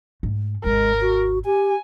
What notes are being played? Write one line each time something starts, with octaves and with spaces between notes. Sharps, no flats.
G#2 A3
G#1 D#2 G#3 A#4
F#4
G4 G#5